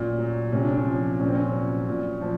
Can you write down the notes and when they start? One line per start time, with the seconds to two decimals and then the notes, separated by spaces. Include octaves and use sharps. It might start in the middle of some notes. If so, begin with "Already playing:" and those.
Already playing: A#2 F#3 C#4
0.19 F#3
0.52 C3 C#4
0.65 D4
0.77 C#4
0.87 F3
1.20 A#2 C#4
1.28 C4
1.35 C#4
1.53 F#3
1.88 A#2
2.21 F3